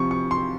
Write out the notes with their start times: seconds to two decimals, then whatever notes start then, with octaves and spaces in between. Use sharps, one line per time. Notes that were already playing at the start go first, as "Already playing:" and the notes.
Already playing: C3 F3 C#6
0.11 C#6
0.31 C6